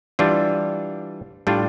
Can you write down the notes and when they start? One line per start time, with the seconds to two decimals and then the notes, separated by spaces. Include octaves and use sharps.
0.19 E3 G3 D4 F4
1.47 A2 G3 D4 F4